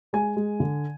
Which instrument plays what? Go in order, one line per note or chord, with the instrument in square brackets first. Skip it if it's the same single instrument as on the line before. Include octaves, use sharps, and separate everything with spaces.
[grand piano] G#3 G#5
G#3
D3